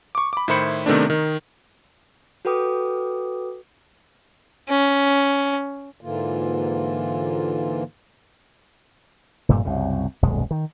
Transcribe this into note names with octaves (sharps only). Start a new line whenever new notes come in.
C#6 D6
B5 D6
A2 D#3 E4 C5 B5 C#7
C3 D#3 A3 B3 C4 D4
D#3
F#4 A4 B4 G5 D6 D#6
C#4
G#2 D3 E3 A#3 F4
F1 G2 A#2 A3
C2 F#2 C#3
D#1 B1 F#2 G#3
D#3